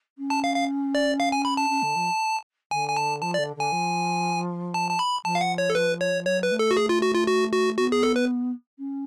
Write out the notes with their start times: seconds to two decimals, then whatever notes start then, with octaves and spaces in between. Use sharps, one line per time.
0.18 C#4
0.30 A5
0.44 F5
0.56 F5
0.95 D5
1.20 F5
1.32 G#5
1.45 B5
1.57 A5
1.69 C#4
1.82 D3
1.96 F3
2.71 D3 G#5
2.89 G#5
2.97 A5
3.22 F3 A5
3.34 D5
3.38 D3
3.56 D3 G#5
3.72 F3
4.74 A5
4.91 A5
4.99 B5
5.25 F3 A5
5.35 F5
5.41 F#5
5.58 C#5
5.70 A4
5.75 B4
6.01 C#5
6.26 F#3 C#5
6.43 B4
6.51 A3
6.59 A4
6.71 F#4
6.77 G#4
6.89 F4
7.02 F#4
7.14 F4
7.27 F#4
7.52 F#4
7.77 B3 F#4
7.92 G#4
8.03 A4
8.16 B4
8.78 C#4